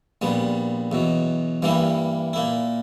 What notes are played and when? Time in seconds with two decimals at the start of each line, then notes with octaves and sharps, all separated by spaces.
0.21 A#1 A#2 G3 B3
0.92 E2 B2 F#3
1.62 G2 E3 G3 A#3 E4
2.33 A#2 A#3 E4